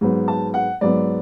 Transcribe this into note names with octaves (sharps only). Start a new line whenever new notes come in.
G#2 F#3 B3
A5
F#5
G#2 F#3 B3 D5